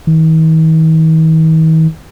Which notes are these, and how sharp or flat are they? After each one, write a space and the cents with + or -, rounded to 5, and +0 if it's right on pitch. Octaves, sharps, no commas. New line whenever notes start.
D#3 +45